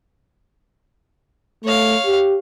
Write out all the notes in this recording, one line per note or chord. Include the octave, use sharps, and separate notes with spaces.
A3 C#5 F5
G4